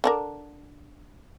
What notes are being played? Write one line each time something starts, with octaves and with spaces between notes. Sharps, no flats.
D3 D4 A#4